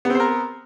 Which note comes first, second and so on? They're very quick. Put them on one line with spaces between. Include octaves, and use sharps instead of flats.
B3 C4 C5 A#4